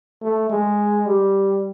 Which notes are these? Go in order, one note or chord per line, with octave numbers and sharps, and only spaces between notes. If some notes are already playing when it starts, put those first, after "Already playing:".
A3
G#3
G3